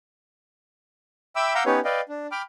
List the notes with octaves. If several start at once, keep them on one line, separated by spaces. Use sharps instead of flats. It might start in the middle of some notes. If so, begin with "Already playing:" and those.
E5 G5 B5 D6 E6
F5 F#5 A#5 D6 E6 G6
B3 C#4 D#4 G4 B4 C#5
B4 D5 D#5 F5 G5
D4
G5 B5 D6 F6